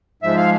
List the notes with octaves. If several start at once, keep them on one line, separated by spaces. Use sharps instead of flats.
G#2 F3 G#3 E5
F5